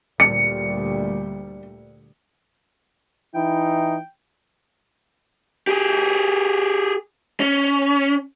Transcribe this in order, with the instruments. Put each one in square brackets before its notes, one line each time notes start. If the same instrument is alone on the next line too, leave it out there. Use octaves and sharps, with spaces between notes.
[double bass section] D2 A#2 G3 [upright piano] C#7
[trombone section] E3 D#4 E4 [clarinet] G5
[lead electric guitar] G4 G#4
C#4